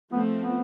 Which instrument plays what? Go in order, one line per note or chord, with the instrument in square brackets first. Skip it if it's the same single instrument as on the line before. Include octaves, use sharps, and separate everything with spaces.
[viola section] F3 A3 C4 [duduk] B3
[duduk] B3